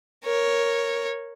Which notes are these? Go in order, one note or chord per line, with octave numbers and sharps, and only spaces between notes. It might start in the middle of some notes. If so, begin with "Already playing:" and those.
A#4 C#5